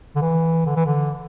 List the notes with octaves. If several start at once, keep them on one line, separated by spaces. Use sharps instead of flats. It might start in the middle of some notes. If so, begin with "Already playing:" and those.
D3
E3
D3
E3
D3